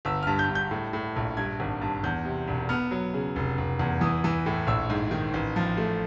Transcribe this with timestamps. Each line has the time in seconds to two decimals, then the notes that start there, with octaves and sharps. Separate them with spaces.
0.05 G1 E6
0.23 G2 F6
0.39 G6
0.50 G2
0.55 G6
0.71 A2
0.93 A2
1.16 A#1
1.37 G2 G#6
1.60 G#1
1.81 G2
2.04 E2 G6
2.25 C3
2.48 E1
2.69 B3 F6
2.91 F#3
3.14 C#3
3.36 F1
3.58 F1
3.79 E2
4.01 E3 D#6
4.24 E3
4.46 A2
4.67 A#1 E6
4.90 G#2
5.11 D#3
5.34 A1
5.56 F3
5.77 A3